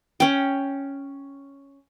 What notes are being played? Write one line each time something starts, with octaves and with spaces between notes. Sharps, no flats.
C#4 G5